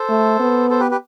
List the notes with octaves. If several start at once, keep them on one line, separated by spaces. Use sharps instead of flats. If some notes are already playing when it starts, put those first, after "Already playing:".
Already playing: A4 C5
A3
B3
A4 C5
G4 B4
G4 B4